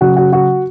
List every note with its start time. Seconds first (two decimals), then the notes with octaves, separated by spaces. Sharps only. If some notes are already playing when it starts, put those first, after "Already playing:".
0.01 C#3 F#3 F#4 F#5
0.17 F#4 F#5
0.33 F#4 F#5